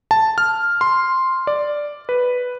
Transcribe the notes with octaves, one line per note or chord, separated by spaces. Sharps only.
A5
F6
C6
D5
B4